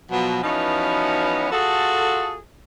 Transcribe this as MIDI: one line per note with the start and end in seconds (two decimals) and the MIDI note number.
0.10 0.42 47
0.10 0.42 53
0.10 0.42 54
0.43 1.47 52
0.43 1.47 53
0.43 1.47 59
0.43 1.47 61
0.43 1.47 63
0.43 1.47 66
1.51 2.37 65
1.51 2.37 66
1.51 2.37 68
1.51 2.37 69